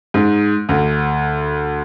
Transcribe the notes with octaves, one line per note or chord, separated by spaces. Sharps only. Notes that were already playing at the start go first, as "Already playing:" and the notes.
G#2
D2